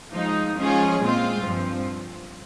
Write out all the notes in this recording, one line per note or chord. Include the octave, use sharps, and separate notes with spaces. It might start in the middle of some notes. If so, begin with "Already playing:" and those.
F3 G#3 D#4
F3 G#3 C#4 F4 G#4
A#2 G#3 C4 F4
G2 F3 C4